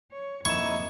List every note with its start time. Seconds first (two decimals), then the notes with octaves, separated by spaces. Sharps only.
0.12 C#5
0.45 F2 A#3 D#4 E4 C#6 G#6 E7